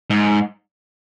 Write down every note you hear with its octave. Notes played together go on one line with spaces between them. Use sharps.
G#2